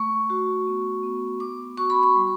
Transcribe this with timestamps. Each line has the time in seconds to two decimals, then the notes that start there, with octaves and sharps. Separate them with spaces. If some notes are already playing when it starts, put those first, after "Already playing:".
Already playing: A3 C#6
0.30 F#4
0.67 B3
1.03 B3
1.40 B3 D6
1.78 F#4 C#6
1.90 B5
2.03 C#6
2.15 G3